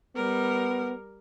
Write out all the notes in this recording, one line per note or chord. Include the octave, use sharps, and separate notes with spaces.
G3 B3 A#4